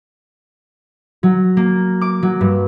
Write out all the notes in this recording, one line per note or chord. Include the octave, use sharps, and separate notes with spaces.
F#3
A#3
D6
F#3
G2